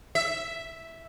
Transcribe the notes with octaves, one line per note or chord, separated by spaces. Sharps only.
E5